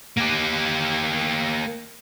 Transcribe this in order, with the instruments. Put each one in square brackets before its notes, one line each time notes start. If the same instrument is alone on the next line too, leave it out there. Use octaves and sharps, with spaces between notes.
[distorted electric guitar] A#3 G4